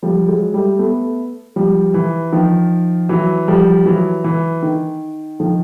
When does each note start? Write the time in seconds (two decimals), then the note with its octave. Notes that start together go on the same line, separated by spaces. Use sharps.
0.03 F3 G3
0.28 F#3 G#3
0.54 G3 A3
0.79 A3 B3
1.56 F3 G3
1.94 E3
2.32 D#3 F3
3.09 E3 F#3
3.48 F3 G3
3.86 E3 F#3
4.24 E3
4.63 D#3
5.40 D#3 F3